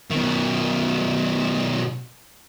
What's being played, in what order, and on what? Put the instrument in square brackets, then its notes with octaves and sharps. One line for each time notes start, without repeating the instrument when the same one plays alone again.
[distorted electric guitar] B2 D#3